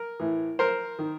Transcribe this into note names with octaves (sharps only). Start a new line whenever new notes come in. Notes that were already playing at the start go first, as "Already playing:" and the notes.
Already playing: A#4
A2 E3
A#4 C5
D#3